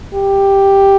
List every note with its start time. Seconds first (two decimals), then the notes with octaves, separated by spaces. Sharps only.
0.14 G4